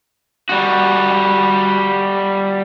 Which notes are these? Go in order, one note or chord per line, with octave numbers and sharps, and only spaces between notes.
G3 F#4